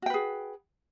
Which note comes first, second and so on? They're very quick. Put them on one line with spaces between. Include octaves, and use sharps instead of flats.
F#4 G5 B4 G#4